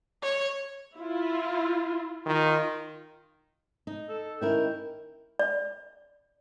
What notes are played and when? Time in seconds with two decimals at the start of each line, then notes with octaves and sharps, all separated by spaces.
0.22 C#5
0.96 E4 F4
2.26 D#3 F4
3.87 D#4
4.09 A4
4.41 D#3 C#4 E4 A#4 G5
5.39 D5